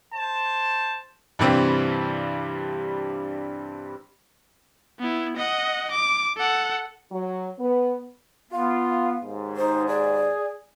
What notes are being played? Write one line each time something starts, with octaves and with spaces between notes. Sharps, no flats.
C5 A5
G2 C3 E3 G3 C4
B3 E4
D#5 F#5
D6
A4 F#5
F#3
B3
B3 F4 F5
D#2 G#2
D#4 C5
G#4 D5